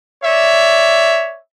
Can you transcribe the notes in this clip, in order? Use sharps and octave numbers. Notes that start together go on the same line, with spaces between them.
C#5 D5 E5